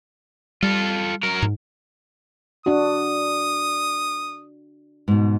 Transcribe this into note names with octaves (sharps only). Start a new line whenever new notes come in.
G3 F4 A4
F#3 A#4
G#2
D4 F#4 D#6
G#2 B2